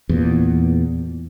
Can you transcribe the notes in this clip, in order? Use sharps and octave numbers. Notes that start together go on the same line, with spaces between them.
E2 A#2